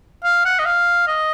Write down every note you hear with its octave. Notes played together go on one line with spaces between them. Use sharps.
F5
F#5
D#5
F5
D#5